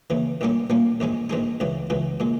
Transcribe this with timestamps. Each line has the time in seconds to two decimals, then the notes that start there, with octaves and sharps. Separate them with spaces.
0.10 D#2 C#3 E3
0.41 A#1 A#2 G3 A#3 C#4
0.70 A#1 A#2 G3 A#3 C#4
1.00 A#1 G#2 D#3 G#3 D#4
1.30 A#1 G#2 D#3 G#3 D#4
1.60 C#2 C#3 E3
1.90 C#2 C#3 E3
2.20 A#2 G#3